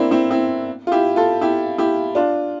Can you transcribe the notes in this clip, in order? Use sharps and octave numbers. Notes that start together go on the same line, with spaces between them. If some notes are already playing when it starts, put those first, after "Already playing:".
Already playing: A#3 C4 D4 E4
C4 E4
C4 E4
F4
E4 G4
F4 A4
E4 G4
E4 G4
D4 F4